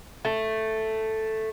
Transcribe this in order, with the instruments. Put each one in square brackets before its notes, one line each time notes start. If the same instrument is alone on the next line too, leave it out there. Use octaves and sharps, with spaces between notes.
[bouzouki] A3